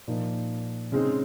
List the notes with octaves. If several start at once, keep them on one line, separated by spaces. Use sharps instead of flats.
A#2 F3 A#3 D#4
C#3 G#3 C4 D#4